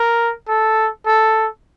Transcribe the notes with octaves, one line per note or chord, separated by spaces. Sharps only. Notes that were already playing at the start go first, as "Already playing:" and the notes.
Already playing: A#4
A4
A4